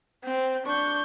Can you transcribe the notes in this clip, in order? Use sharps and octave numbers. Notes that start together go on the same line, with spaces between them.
C4
D4 C#6 G6